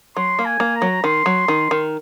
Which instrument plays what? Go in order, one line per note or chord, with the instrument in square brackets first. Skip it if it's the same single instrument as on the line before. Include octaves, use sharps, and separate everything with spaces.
[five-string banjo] F#3 [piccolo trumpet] C6
[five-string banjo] A#3
[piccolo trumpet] G#5
[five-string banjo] A#3
[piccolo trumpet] A#5
[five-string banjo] F#3
[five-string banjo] D#3 [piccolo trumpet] C6
[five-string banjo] F#3
D#3
D#3